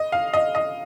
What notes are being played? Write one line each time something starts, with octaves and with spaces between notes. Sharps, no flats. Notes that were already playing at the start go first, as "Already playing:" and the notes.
Already playing: D#5
F5
D#5
D#5